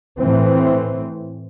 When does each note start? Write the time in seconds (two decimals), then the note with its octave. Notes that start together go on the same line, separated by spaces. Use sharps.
0.17 A2 E3 C4